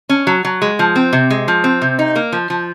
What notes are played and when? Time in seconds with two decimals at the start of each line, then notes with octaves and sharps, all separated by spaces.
0.09 C#4
0.27 F#3
0.45 F#3
0.62 G#3
0.79 F3
0.96 C4
1.13 C3
1.30 G#3
1.48 F3
1.64 C4
1.82 C3
1.99 D#4
2.16 A#3
2.32 F3
2.50 F3